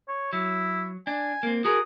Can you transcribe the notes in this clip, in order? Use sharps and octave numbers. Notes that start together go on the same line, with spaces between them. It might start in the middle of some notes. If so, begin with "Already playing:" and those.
C#5
F#3 E4
D4 G#5
A#3 C4
F#4 G#4 A#4 D#6